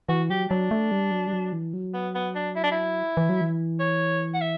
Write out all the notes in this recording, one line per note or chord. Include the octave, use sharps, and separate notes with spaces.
E3 F#4
F#3 G4
F#3 D4
A3
G3
F#3
G3
F#3
E3
F#3
B3
B3
D4
E4
D4
E4
E3
F#3
E3
C#5
F#5
E5